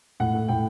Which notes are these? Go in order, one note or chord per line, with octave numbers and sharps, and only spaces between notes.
A2 F#5
A3
A2 G5